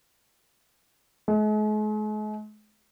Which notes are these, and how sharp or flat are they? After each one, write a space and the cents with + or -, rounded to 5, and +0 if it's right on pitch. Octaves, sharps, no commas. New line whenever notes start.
G#3 +45